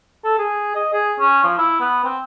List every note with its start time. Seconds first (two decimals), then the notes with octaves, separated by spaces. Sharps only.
0.24 A4
0.38 G#4
0.75 D#5
0.93 G#4
1.19 C#4
1.43 F3
1.58 E4
1.81 B3
2.04 C4